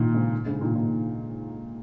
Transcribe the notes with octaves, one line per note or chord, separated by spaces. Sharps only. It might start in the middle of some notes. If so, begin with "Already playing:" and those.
Already playing: A#2 D#3
G#2 C#3
G#2 C#3
A#2 D#3
A#2